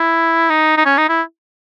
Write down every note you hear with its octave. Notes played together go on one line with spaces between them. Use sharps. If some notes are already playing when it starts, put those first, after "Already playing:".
Already playing: E4
D#4
D#4
C#4
D#4
E4